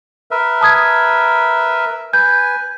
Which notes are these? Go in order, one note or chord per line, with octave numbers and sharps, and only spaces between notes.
A#4 B4 E5
A5 D#6 G#6
B4 G#5 G6